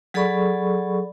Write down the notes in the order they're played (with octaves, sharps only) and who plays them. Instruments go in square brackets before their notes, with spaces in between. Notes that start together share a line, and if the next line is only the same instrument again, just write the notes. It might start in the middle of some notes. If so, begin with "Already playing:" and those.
[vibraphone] F#3 G#4 A4 D5 B5 C#6